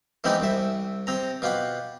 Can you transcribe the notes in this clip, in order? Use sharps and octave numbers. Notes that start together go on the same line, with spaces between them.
E3 G#3 B3 C4 D#4 G4
C2 C3 E5
C3 C4 A#5
B2 F4 G4 F#5